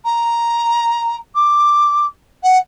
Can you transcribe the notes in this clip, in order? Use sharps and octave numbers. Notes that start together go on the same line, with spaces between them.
A#5
D6
F#5